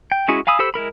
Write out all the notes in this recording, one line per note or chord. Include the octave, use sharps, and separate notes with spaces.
G5
G#3 C#4 E4 F#4 G#4
F5 G#5 B5 D#6 E6
G4 A4 C5 B5 E6
G#3 E4 A#4 B5